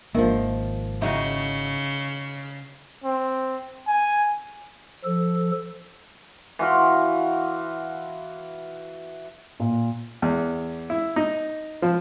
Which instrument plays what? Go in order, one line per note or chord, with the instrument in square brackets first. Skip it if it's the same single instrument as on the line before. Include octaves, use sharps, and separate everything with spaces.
[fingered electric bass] G#1 A#3 D4 [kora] D#3 F3 [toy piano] A#4 E5
[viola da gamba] C#3 [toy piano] C#4 E4 E5 [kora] D#4 F#4
[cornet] C4
G#5
[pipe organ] F3 A4
[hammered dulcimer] E3 F#4 F5 C6
[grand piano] A#2
[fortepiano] E2
E4
D#4
F3